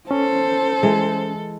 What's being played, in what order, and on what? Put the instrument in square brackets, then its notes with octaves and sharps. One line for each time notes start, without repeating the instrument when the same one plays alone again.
[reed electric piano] C#4 [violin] A4 [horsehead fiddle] C5
[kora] E3 G#3